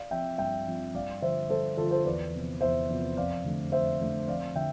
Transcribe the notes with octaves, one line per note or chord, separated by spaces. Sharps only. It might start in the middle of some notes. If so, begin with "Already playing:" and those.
Already playing: D5 F5
F3 C4 E5 G5
G2 E5 G5
F3 C4
G2 D5 F5
D3 F3 C5 E5
G2 A4 C5
D3 F3 F4 A4
A4 C5
E2 B4 D5
C3 F3 B3
E2 C5 E5
C3 F3 B3
F2 D5 F5
D3 A3
F2 C5 E5
D3 A3
F2 D5 F5
D3 E5 G5